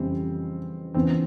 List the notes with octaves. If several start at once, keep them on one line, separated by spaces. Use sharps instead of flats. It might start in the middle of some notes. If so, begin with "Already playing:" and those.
Already playing: F2 C#3 E3 G3 C4
E2 C#3 E3 C4